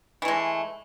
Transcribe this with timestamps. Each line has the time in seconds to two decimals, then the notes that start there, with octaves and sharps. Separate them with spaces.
0.22 E3
0.25 A3
0.28 G#3